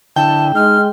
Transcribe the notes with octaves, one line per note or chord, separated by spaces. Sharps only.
D3 E4 G5 A5
G#3 D#4 F6